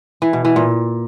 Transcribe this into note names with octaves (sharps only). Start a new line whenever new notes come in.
E3
B2
E3
A#2